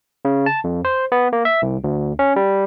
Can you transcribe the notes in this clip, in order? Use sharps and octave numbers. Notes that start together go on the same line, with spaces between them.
C#3
A5
F2
C5
B3
A#3
E5
C2
D2
C#4
G3